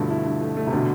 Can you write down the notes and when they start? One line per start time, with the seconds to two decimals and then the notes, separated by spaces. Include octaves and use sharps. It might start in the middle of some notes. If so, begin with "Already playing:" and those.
Already playing: G2 B2 D3 F3 A3 E4
0.10 E4
0.26 G2
0.41 A3
0.57 A3
0.67 C3
0.73 B2 D3